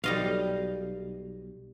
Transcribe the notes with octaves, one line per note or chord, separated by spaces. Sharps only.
B1 G3 D#5 F5